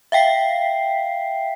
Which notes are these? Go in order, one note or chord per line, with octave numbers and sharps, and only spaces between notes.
E5 F5 G5 B6 C7